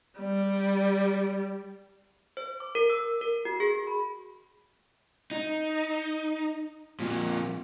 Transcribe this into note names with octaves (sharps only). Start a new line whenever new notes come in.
G3
C5
D6
A#4
E6
A#4
F#4
G#4
B5
D#4
F2 A#2